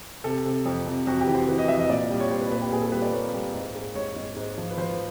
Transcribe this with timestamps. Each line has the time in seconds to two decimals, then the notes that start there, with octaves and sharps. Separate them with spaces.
0.24 C3 A4
0.45 C3
0.66 F2
0.86 C3
1.07 F2 F#4
1.21 G4
1.27 E3
1.35 C5
1.49 E3
1.58 D#5
1.68 F2 E5
1.79 D#5
1.89 A#2 D5
2.10 G3
2.20 C#5
2.30 G3 C5
2.41 B4
2.51 A#2 B4
2.62 G4
2.72 A#2 G#4
2.82 A4
2.92 G3 B4
3.02 D5
3.13 A#3 C#5
3.34 G3
3.54 G#2
3.75 G#3
3.95 G#2 C#5
4.16 G#2
4.36 G#2
4.58 F3
4.70 B4
4.77 F3 C5